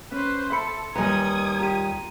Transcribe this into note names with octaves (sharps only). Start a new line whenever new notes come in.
C#4 B4 C5
A4 E5 B5 C6 C#7
D#2 G3 B4 D#5 G#5 A#5 D#6 G#6
F4 G4 A#5 D#7